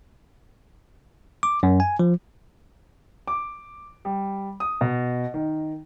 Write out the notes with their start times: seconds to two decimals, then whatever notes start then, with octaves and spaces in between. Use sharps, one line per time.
1.43 D6
1.63 F#2
1.80 G#5
1.99 F3
3.28 D6
4.05 G3
4.60 D#6
4.81 B2
5.34 D#3